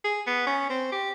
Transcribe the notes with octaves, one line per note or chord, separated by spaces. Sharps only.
G#4
B3
C#4
C4
G4